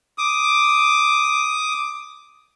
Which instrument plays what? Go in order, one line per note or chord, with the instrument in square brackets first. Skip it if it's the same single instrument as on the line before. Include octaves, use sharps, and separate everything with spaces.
[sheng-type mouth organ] D6 D#6